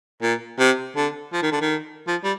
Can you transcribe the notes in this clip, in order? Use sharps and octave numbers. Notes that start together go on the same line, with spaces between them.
A#2
C3
D3
F3
D#3
D3
D#3
F3
G3